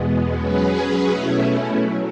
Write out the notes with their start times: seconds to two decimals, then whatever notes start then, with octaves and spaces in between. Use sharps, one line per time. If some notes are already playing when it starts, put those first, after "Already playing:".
Already playing: E2 B2 G#3 B3
0.37 F#3 C#4 G#4 B4
1.09 B2 A3 C#4 E4
1.81 F#3